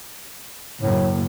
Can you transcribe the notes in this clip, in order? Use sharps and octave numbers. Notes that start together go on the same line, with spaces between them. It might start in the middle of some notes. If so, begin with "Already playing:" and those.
F#2 A2 C#3 A#3